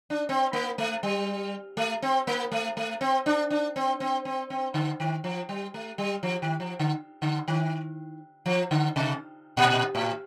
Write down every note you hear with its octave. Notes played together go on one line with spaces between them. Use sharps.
D4
C4
A#3
A3
G3
A3
C4
A#3
A3
A3
C4
D4
D4
C4
C4
C4
C4
D3
D#3
F3
G3
A3
G3
F3
D#3
F3
D3
D3
D#3
F3
D3
C3
A#2
A2